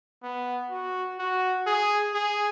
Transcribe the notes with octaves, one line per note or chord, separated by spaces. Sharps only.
B3
F#4
F#4
G#4
G#4